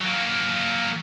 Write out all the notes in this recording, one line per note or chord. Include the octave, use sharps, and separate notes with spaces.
F#3 A#3